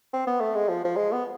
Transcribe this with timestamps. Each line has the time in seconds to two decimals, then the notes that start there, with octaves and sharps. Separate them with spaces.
0.13 C4
0.27 B3
0.40 A3
0.55 G#3
0.69 F3
0.85 F3
0.97 G#3
1.12 B3